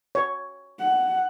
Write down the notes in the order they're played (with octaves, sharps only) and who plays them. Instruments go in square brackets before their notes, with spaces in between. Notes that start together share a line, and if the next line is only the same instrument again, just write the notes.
[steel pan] C#5
[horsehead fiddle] F#5